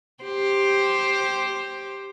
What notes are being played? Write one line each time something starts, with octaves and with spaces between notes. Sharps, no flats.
G4 C5